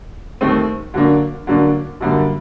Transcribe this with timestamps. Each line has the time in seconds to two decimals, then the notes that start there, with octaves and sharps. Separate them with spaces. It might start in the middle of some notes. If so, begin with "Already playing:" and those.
0.41 D#2 D#3 A3 C4
0.94 D3 F#3 A#3 D4
1.47 D3 F#3 A#3 D4
2.01 F#2 D3 G3 A#3